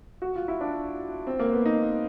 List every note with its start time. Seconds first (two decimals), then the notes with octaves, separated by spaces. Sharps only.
0.22 F#4
0.35 F4
0.48 E4
0.61 D4
1.27 C4
1.40 A#3
1.52 B3
1.66 D#4